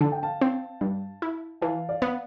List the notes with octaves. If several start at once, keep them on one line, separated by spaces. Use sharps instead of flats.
D3 A5
G5
F5 A5
C4
G2
E4
E3 F5 A5
D5 F5
B3